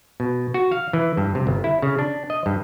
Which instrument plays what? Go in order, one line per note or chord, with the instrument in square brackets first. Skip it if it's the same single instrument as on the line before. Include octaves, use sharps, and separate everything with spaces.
[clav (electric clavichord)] B2
F#4
F5
E3
G2
C3
G1
E4
C#3
D4
D#5
G2